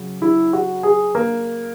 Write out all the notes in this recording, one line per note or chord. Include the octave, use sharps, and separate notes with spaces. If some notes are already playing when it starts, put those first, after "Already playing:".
Already playing: C#3 F#3
E4
F#4
G#4
A#3